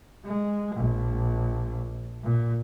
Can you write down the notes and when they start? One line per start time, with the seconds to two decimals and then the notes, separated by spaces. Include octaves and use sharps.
0.24 G#3
0.75 A#1
2.24 A#2